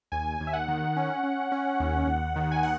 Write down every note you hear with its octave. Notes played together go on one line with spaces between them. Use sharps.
D#2 G#5
D#2
E5
F#5
D#3
C#4
C#4
C#4
D#2
D#2
D#3
G#5
F#5